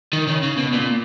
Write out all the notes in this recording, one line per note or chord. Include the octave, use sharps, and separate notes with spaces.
D#3
C#3
C#3
B2
A#2